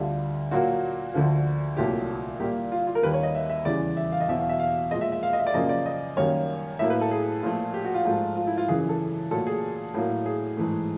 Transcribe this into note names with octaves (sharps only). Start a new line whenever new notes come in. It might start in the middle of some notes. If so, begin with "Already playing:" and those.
Already playing: D2 D3 G3 F4
A#2 F#3 A#3 F#4
D2 D3 F3
C2 A#2 F#3 A3 G4
A#2 G3 A#3 G4
F4
F4
A#4
D#2 D#3 G3 A#3 B4
C#5
D#5
E5
E5
E2 C#3 E3 G3 D5
E5
F5
D#5
E2 B2 F#3 E5
F5
E5
F5
A#2 F3 G#3 D#5
E5
E5
F5
D#5
E5
D5
F#2 C#3 F3 A#3 D#5
D5
D#5
F#2 D#3 G3 A#3 C#5
A2 F#3 A#3 E5
B4
A4
G#4
A#2 F3 A3
G4
F#4
F4
G#2 F3 A3
F4
E4
F4
F#2 C#3 E3 G#4
G#4
A4
A#2 F#3 A3 A4
G#4
A2 F#3 A#3
G#4
G#2 E3 A3